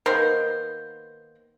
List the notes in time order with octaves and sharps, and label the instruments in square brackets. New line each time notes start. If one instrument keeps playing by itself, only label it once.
[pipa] D#3 A#3 B3 C5